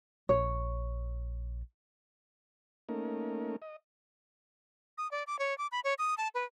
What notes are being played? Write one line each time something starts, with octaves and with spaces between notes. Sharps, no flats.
A#1 C#5
A3 A#3 C#4 D#4 A#4
D#5
D#6
D5
D6
C#5
D6
B5
C#5
D#6
A5
B4